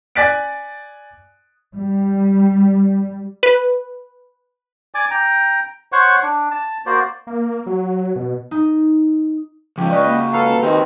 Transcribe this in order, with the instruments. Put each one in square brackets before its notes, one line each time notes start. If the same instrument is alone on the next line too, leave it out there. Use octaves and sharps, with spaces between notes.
[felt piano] D5 G#5 F#6 A6 B6 D7
[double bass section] G3
[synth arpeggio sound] B4
[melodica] D5 G#5 D6
G5 A#5
C5 C#5 F#5 C#6
D4
A5
A#3 F#4 C5 D5
[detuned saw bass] A#3
F#3
B2
[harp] D#4
[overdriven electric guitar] C#2 C#3 [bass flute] F3 [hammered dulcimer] G4
[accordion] B4 D#5 [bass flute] D5 [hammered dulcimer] C#6
[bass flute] A#3 [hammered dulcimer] F#4
[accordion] A4 F5 [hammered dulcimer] B4 A#5
[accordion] D#3 D#4 [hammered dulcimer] C4 [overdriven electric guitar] G4 D#5